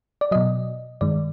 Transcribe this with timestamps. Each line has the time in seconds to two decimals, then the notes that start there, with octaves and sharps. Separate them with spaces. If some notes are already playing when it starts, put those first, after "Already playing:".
0.21 D5
0.31 B2 F#3 D#5
1.01 G2 D#3 G#3 D5